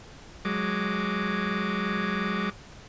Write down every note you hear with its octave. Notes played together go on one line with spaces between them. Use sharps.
F#3 G#3 D6